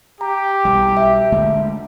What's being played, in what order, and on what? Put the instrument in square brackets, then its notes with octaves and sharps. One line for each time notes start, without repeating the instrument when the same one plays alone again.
[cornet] G4 [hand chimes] A#5
[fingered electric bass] B1 G3
[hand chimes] E5
[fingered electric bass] D3 G#3 A3